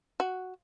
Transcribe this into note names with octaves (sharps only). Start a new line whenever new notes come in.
F#4